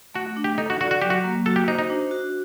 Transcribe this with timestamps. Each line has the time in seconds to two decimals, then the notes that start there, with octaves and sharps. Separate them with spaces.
0.14 A3 F#4
0.36 D4
0.44 G4
0.58 D#4 A4
0.70 F#4
0.80 F#4 D5
0.91 F#4
1.02 F#3 G4
1.10 F#4
1.24 A#3
1.46 F#4 A4
1.56 G4
1.68 D#4 C5
1.79 D#4
1.90 D4
2.11 F#4